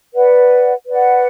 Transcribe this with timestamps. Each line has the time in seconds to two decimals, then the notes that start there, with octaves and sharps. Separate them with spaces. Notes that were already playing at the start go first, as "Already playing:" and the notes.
0.14 B4 D5 F#5
0.88 B4 D5 F#5